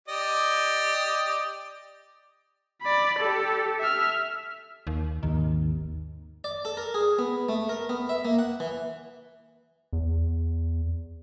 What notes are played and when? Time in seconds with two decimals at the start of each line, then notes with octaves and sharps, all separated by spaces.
0.08 G4 D5 D#5
2.82 D5 B5
3.19 G4 A4
3.79 E5 F6
4.87 D#2
5.23 G#1 D#2 D#3
6.44 D5
6.65 A4
6.77 A#4
6.94 G#4
7.19 B3
7.49 A3
7.69 A#4
7.89 B3
8.09 E5
8.25 A#3
8.39 F#5
8.60 E3
9.93 E2